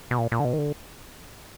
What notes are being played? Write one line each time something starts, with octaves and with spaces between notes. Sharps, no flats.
B2
A#2
A#2
D3
B2
D#3
D3